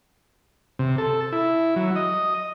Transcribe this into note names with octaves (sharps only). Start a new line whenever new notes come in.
C3
A4
E4
F#3
D#5